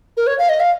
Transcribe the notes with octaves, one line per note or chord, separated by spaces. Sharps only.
A#4
C#5
F5
D#5
F5